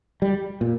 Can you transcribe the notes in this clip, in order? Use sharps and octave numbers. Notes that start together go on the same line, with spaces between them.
G3
A#2